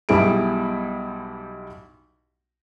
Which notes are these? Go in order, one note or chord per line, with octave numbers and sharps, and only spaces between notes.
B1 G3 B3 E4 G#4 D7